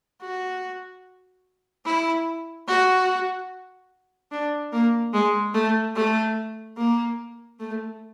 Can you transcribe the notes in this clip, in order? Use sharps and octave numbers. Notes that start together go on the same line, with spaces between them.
F#4
E4
F#4
D4
A#3
G#3
A3
A3
A#3
A3